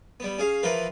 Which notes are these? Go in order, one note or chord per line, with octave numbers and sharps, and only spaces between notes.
G3 B3
C#4 G#4 F5
E3 F3 F4 A#4 B4